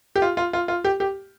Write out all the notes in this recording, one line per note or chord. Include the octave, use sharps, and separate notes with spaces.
G4
F4
F4
F4
F4
G4
G4